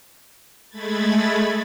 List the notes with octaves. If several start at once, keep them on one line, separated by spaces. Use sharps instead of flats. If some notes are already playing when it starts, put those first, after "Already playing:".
G#3 A3 B5 G#6 A6